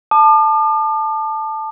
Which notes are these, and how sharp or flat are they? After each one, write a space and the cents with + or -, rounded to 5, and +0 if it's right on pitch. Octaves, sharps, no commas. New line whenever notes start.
A5 +0 D6 +45